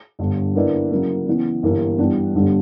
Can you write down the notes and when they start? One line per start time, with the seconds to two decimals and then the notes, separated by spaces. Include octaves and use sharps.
0.19 G1 G2 D3
0.55 D3 A#3 E4 B4 D5
0.91 C#3 F#3 A#3 E4
1.26 C#3 E3 B3
1.63 G1 G2 E3 A#3
1.98 G2 E3 B3 D4 G4
2.34 G1 G2 D3 G3